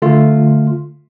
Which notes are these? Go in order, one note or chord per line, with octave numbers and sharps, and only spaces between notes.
D3 A3 F4